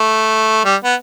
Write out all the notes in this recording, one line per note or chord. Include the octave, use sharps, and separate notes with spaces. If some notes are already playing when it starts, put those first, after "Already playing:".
Already playing: A3
G3
B3